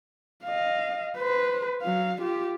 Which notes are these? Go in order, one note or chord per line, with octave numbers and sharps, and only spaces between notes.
D#5 F5
B4 C5
F#3 F5
F4 G4